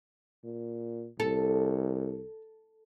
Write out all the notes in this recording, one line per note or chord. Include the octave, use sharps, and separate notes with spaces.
A#2
C2 A4